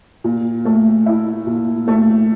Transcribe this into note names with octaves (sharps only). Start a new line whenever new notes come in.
A#2
A3
E4
A#2
A3